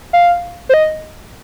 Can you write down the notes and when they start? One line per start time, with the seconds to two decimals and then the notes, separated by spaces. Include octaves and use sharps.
0.13 F5
0.69 C5
0.74 D#5